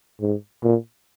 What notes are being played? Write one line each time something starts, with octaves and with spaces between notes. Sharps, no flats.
G#2
A#2